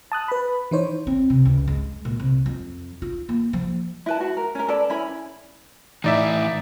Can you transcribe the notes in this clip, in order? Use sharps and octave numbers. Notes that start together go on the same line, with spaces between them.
A5 D#6 F#6
B4 B5
E3 D#4 C5 C#5
C4
C3
C#2
G#3
A#2
C2
F2
F4
A#3
F3
E4 B4 A5
F#4
A#4
C#4 A#4
A4 B4 D5
C#4 E4 B5
A2 E3 D#4 D5 E5